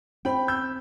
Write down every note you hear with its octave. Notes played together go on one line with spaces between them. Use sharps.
C4 G5 B5
E6 G6